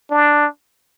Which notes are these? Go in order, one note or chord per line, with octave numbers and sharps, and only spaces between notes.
D4